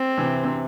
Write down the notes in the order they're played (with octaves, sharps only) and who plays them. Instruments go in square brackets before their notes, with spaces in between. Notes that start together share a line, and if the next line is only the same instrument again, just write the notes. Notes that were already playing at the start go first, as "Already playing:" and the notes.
Already playing: [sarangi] C4
[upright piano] C3 E3
C3